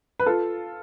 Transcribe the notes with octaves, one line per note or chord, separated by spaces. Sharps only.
B4
F4 A4